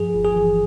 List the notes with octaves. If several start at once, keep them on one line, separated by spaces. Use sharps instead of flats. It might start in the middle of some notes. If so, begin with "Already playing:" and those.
Already playing: G2 F3 G#4
G1
G#4
E3